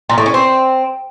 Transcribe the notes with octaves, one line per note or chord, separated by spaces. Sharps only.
A#2
A2
C#4
C4